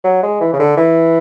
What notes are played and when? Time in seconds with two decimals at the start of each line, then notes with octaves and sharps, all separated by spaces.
0.04 F#3
0.23 G#3
0.41 E3
0.53 C#3
0.59 D3
0.77 E3